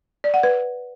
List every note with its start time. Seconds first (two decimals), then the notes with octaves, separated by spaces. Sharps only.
0.24 D5
0.34 F#5
0.43 B4